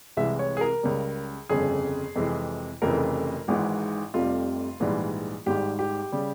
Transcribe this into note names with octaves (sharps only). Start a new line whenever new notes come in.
C2 C3 E3 G#3 E5
C#5
G#4
A#4
C#2 C#3 G3
G1 F2 C#3 G#4
F2 C3 E3 G#3
F1 F2 C#3 E3 A#4
G#1 G#2 E3
F1 F2 C3 G3 F4
A#1 G#2 E3 G3
G#1 G#2 G3 G4
G4
C#3 G3